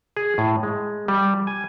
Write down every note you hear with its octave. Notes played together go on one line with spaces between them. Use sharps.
G#4
A2
G#3
G3
G#5